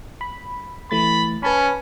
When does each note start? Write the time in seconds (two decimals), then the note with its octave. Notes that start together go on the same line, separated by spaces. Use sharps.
0.21 B5
0.91 E3 A3 B5 A6
1.43 C#4 B4 A5 B5